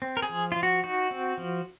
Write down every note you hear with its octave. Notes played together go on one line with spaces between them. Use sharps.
C4
A#4
G#4
F3
F3 F4
F#4
D#4 F#4
C4
F3